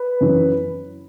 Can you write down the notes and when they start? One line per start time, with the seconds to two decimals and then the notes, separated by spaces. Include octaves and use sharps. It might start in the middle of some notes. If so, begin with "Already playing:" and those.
Already playing: B4
0.21 F#2 E3